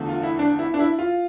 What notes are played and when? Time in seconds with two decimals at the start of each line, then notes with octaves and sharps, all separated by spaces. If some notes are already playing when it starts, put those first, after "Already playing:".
Already playing: E2 D3 F3 A3
0.09 F4
0.23 E4
0.39 D4
0.59 E4
0.74 D4
0.79 E4
0.99 F4